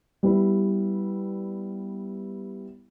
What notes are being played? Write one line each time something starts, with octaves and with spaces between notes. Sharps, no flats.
G3 B3 E4